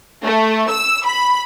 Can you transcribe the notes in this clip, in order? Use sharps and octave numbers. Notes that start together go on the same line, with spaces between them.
A3
E6
B5